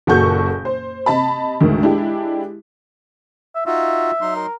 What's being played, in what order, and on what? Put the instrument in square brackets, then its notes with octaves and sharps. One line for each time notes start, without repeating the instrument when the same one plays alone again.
[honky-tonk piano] F#1 A#2 F#4 A4 C#6 G6
C5
C3 D#5 A5 B5
D2 G#2 D#3
G#3 D4 E4 G4
[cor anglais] E5
[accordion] D#4 F4 F#4 [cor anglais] E5
[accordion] F#3 D#4 C6
[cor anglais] A#4